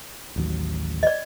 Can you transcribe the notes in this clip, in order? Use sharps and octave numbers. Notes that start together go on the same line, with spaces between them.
A1 D#2 F#3
D5 D#5